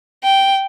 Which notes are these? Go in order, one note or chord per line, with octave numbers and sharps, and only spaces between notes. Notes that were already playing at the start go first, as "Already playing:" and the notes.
G5